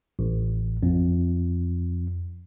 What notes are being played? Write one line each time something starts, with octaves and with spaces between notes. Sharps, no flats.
A1
F2